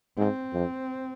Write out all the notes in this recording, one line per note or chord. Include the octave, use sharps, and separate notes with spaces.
G#2 C4
F2